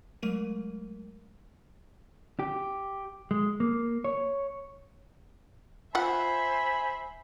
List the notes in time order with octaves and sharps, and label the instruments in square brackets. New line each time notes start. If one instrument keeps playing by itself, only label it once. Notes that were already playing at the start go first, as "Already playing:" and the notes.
[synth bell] F#3 G#3 A3 A#4 D#7
[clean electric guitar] G4
G#3
A#3
C#5
[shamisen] F4 F#5 [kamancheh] C5 E5 [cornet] G#5 [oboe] B5